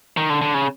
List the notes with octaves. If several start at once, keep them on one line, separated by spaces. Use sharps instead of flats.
D#3
D3
D3
C#3